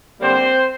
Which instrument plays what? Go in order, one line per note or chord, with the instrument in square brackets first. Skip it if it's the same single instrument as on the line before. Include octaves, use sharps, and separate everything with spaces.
[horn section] D3 G3 A#3 C4 C5